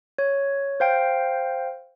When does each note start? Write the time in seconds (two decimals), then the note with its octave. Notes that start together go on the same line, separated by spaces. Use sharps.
0.18 C#5
0.80 C5 F5 G5